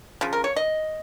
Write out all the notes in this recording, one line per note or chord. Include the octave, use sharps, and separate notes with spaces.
C#3 F3
A#4
C#5
D#5